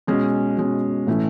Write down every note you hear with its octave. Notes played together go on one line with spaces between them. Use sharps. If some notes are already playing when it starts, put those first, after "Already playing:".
B2 G#3 C#4
B2 G#3 C#4
A2 E3 A3 C#4 E4